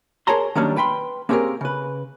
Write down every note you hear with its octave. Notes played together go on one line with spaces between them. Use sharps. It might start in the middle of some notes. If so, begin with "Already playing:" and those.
G#4 A#4 C#5 A5 A#5 C6
D#3 F#3 G3 A#3 C#4 D4
B4 G5 B5 C6
A#3 C4 C#4 G4 G#4 A#4
C#3 B4